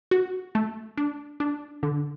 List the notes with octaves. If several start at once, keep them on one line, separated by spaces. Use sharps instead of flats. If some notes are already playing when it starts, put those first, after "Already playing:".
F#4
A3
D4
D4
D3